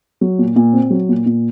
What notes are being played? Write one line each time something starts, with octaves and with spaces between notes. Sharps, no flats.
F#3
A#2
A#2
C4
F#3
A#2
A#2